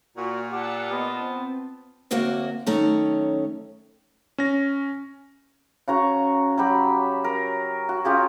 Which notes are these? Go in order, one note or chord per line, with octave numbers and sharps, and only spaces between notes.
A#2 F#4
F4 G4 F#5 A5 E6 C#7
B3 D#5
C4
D2 C3 F#3 A#3 F#4
F#2 D#3 A3 C#4 C#5 A#5
C#4 A#6
C#3 F#4 A#5 C#6
F#3 G4 B5
A#4
F#4
C#4 F4 G4 G#4